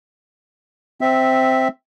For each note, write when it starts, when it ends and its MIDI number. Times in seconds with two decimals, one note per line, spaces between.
1.01 1.68 60
1.01 1.68 76